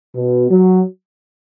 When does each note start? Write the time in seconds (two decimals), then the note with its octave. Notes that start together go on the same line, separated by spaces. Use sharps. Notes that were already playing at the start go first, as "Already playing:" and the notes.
0.16 B2
0.51 F#3